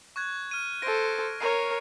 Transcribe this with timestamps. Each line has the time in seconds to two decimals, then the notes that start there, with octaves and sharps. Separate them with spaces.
0.16 C#6 F#6 G#6
0.51 F6 D#7
0.82 A4 C5 A#6 D7
1.40 A#4 C#5 C7 D#7